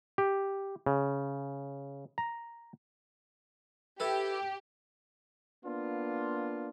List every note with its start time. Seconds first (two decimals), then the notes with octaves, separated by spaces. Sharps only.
0.18 G4
0.86 C#3
2.18 A#5
4.00 E4 G4 A4 B4
5.65 A#3 B3 D4 F4